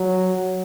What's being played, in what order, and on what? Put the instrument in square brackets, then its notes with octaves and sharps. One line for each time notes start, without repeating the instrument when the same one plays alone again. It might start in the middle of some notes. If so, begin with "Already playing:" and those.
Already playing: [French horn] F#3